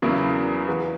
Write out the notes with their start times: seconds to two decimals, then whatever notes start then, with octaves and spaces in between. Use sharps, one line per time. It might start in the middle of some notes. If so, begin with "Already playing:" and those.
0.02 E2 C#3 F#3 A#3 E4
0.68 E3 B3 F#4